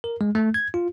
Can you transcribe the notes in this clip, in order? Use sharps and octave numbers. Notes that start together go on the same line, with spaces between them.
A#4
G#3
A3
G#6
F4